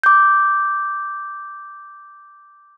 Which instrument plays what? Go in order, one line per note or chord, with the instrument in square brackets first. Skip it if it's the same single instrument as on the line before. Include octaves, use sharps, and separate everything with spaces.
[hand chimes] D6 G6